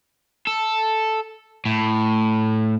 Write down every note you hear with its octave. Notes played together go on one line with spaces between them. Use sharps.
A4
A2